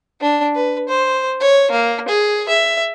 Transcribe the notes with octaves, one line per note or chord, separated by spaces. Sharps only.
D4
B4
C5
C#5
A#3
G#4
E5